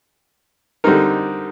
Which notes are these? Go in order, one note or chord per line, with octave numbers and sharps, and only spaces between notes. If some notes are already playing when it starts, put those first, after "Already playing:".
D3 G3 C4 D#4 A#4